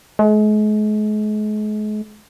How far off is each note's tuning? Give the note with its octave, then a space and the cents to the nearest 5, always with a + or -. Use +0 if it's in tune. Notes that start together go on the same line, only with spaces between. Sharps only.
G#3 +40